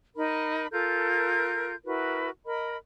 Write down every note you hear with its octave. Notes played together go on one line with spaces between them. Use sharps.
D#4 A#4 B5
F4 A4 A#4 G6
E4 F#4 A#4 B4
A#4 D#5 B5